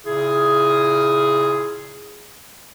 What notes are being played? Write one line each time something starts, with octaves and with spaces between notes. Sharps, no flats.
A#2 C#3 E4 G#4